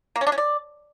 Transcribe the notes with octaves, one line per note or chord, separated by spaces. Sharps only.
A#3
C#4
D4
C#4
D5